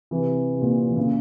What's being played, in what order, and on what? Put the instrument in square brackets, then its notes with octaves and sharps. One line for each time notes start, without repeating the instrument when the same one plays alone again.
[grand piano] C3 E3
C3
A#2
C3
E3
A#2 C#3